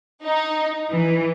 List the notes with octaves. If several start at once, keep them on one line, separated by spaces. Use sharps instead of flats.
D#4
E3